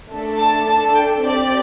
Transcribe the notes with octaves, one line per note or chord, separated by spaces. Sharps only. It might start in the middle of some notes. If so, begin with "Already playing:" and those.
A3 D4 A4
A5
D4 A4 A5
G5
C4 G4 D5